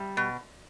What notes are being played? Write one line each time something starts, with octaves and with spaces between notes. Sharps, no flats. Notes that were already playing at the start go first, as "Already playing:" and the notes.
Already playing: G3 E5
B2